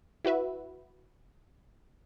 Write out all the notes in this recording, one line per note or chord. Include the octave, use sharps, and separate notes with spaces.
E4 F#4 B4 E5